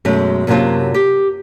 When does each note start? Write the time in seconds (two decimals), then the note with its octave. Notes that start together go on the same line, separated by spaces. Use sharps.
0.05 F#2 B2 G#3 A3
0.47 F#2 C3 F#3 A#3 F4 A5
0.94 G4